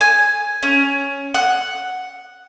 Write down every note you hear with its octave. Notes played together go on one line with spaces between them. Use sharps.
G#5
C#4
F#5